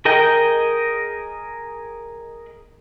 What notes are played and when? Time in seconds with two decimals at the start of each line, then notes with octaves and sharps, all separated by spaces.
0.05 G#4 A#4 D#5 G5